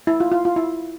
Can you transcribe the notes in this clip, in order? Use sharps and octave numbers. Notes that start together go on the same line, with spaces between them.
E4
F4
F4
F4
E4